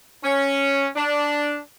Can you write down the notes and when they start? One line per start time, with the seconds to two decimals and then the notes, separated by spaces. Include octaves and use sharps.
0.24 C#4
0.95 D4